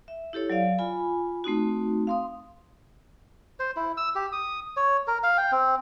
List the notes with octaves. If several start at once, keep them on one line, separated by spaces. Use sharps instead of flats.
E5
E4 G4 A4 C#5
F#3 D5 F5
F4 G#5 B5
A3 C4 D#4 F#4
F5 C6 D#6
C5
E4
E6
G4
D#6
C#5
A#4
F5
G5
C4